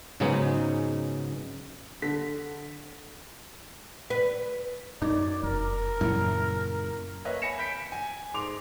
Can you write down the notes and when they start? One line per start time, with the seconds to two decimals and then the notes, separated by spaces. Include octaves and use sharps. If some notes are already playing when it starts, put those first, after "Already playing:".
0.20 G#2 C#3 F#3 G#3 B3 D#4
2.02 D3 A4 B6
4.10 B4
5.02 F#2 D#4 D5
5.43 F1 A#4
6.01 F#2 A#2 C#3 E4
7.25 A#3 B4 C#5 D#5 E5
7.42 G#5 B5 A#6 C#7 E7
7.58 B5 G6 B6 D7
7.92 G#5
8.34 G#2 C6 D6 F7